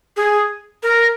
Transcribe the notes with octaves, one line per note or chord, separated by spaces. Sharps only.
G#4
A#4